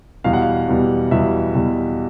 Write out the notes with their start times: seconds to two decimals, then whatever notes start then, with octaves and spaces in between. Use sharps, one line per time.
0.24 E2 B2 G3 F5
0.33 F#5
0.42 F5
0.68 E2 B2 G3
1.11 E2 B2 G3 E5
1.54 E2 B2 G3